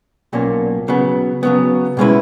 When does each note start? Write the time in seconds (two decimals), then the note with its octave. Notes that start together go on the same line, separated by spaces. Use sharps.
0.33 B1 A#2 A#3 C#4
0.88 C#3 F#3 B3
1.43 C#3 F#3 B3
1.97 B2 G#3 C#4 E4 B4